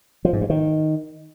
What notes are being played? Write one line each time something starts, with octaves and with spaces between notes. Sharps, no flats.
F3
G#2
G2
D#3